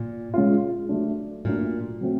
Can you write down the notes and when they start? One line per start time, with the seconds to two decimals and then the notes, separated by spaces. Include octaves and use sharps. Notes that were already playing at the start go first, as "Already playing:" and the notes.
Already playing: A#2
0.34 G#3 C#4 F4
0.89 F#3 A3 D4
1.45 A#2 F#3 A3 D4
2.01 F#3 A3 C4